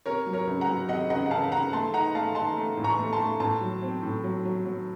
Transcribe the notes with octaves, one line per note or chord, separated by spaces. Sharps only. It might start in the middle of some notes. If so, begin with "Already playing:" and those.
C3 A#4 C#5
F#3
A#4 C#5
C#2
F#5 A#5
F#3
C3 D#5 F#5
C#2 D#5 F#5
F#5
C#2 F5 A5
C#2 F#5 A#5
A3 A5 C6
D#4 F#5 A#5
A3 F5 A5
D#4 A5 C6
A3
A2
A#5 C#6
A3
A5 C6
A3
A2 A5 C6
F#3
C4
A2
F#3
F#3
F#3